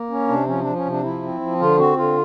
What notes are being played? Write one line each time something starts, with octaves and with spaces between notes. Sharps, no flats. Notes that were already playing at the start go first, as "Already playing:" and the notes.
Already playing: A#3
C#4
C3 D4
F3 C#4
F3 D4
C#4
C3 D4
F3 E4
C4
F3
D3 F4
C4 F#4
D3 F4